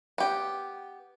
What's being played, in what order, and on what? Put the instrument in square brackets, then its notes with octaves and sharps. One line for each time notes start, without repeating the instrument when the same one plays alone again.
[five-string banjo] B3 G4